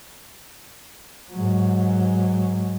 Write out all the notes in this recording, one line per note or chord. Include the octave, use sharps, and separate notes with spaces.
G#2 F#3